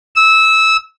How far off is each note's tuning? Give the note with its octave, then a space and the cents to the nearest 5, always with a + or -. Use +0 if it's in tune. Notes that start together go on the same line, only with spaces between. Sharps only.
E6 -20